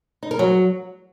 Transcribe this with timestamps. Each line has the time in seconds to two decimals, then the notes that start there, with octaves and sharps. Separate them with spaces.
0.23 D#4
0.31 A#4
0.39 F#3